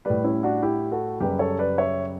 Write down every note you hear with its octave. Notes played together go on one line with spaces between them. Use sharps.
A2 G3 B4 D5
C#4 E4
D4 F#4
E4 G4
F#4 A4
F#2 C#3 G3 G4 B4
A4 C#5
B4 D5
C#5 E5